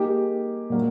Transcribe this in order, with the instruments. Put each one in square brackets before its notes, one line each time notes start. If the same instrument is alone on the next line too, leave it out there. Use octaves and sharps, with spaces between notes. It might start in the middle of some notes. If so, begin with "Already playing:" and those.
Already playing: [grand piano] A#3 D#4 G#4 [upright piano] G4
[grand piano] A#2 F#3 A#3 D4